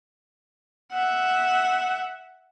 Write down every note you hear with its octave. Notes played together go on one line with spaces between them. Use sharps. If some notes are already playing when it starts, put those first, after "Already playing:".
E5 F#5